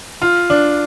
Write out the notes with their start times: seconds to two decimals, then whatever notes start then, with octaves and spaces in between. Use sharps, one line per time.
0.22 F4
0.50 D4